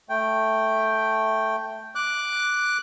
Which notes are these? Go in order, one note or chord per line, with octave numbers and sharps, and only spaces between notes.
A3 G5
D6 F#6